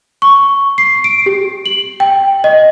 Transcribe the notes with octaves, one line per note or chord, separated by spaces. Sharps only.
C#6
C7
D7
G4
F#7
G5
D#5